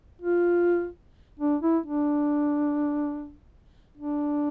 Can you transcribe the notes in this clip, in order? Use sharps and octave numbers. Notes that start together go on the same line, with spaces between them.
F4
D4
E4
D4
D4